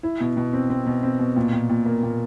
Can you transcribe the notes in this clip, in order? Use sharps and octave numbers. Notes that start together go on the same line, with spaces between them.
E4
B2
B2
C4
C4
B2
C4
B2
A#2
A#2
A#2
A#3
A#2